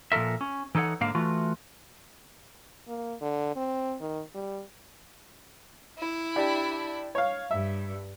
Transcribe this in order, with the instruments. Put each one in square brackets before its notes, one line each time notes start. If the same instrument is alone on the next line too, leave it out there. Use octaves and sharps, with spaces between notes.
[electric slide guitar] A#2 F3 A4 A#4 E5
C#4
E3 D#4 A4 C#5 F#5
G#2 D3 A#3 F5
E3 A3 F4 F#4
[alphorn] A#3
D3
C4
D#3
G3
[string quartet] E4
[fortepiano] D4 G4
C#5 F5
[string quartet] G2 [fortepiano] E5